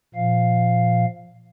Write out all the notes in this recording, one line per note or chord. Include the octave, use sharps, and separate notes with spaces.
A#2 F3 F5